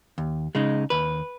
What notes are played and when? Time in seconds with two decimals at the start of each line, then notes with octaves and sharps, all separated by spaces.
0.18 D#2
0.55 C#3 G#3 D#4
0.90 D#2 B4